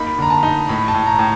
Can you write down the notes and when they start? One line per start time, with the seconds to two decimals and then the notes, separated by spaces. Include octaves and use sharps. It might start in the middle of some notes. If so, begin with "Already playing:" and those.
Already playing: A#3 D#4 B5
0.18 D3 A#5
0.30 A5
0.43 D#4
0.68 A2 B5
0.88 A5
0.94 A2
1.07 A#5
1.19 A2